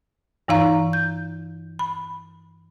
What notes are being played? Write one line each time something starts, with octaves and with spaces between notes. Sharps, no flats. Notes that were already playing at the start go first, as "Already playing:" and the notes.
G2 E3 D#4 F5 A#5
G6
B5